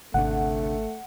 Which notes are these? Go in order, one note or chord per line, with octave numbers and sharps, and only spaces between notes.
G#1 D2 C3 A3 D4 F#5